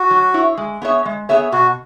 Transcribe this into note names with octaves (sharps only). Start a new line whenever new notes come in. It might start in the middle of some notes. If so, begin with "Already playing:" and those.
Already playing: F#4
F#3
E4 C#5
G#3
B3 G#4 C#5 E5
G#3
B3 G#4 C#5 E5
B2 F#4